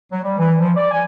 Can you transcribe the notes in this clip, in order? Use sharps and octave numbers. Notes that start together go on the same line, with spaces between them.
F#3
G3
E3
F3
D5
G#5